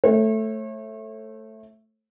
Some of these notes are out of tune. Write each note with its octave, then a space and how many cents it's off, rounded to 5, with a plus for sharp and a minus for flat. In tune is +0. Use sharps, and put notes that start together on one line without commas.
A3 +0 C#5 -40